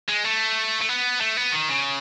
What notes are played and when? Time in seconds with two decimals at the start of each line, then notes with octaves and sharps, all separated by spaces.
0.08 G#3
0.24 A3
0.81 A3
0.89 B3
1.21 A3
1.37 B3
1.52 D#3
1.69 C#3